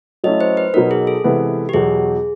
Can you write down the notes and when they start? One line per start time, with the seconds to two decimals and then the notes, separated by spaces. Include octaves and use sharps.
0.24 F#3 A3 C#4 E4 D#5
0.41 C5
0.57 B4
0.73 B2 F#3 B3 D#4 A#4
0.91 G#4
1.07 A4
1.24 C3 E3 G#3 B3
1.69 G4
1.73 E2 B2 F#3 G#4